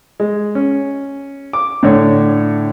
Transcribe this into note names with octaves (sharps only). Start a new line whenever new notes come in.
G#3
C#4
D6
A2 D3 C#5